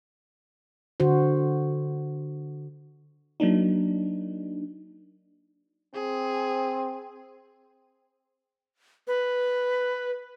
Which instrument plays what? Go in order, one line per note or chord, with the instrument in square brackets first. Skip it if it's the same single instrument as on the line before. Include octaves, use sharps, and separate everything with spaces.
[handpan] D3 F#4 C5
[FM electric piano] F#3 A#3 D4 D#4
[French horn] C4 [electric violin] G#4
[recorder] B4